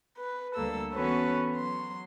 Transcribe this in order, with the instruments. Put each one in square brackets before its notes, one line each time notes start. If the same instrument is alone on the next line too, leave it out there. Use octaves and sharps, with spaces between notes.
[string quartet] B4
D2 G3 A#3 A4 E6
E3 B3 C#4 F#4 A4 B4
F#3 C6